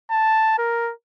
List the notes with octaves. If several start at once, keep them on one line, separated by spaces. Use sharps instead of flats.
A5
A#4